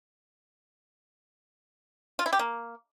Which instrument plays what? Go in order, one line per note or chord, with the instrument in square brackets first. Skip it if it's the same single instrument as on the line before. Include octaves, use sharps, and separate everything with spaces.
[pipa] F4
E4
G4
A#3